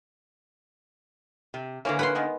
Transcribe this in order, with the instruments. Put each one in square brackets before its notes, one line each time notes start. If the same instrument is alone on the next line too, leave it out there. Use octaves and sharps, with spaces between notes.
[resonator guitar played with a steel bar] C3
[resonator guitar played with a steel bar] D3 A#3 [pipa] E3 F#3 C#4
[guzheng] B4 F#5 C6
[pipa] D#3 G#3 B3